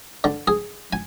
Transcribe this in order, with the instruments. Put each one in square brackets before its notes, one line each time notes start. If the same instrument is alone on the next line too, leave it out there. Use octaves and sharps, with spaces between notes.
[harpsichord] D3
G#4
G#5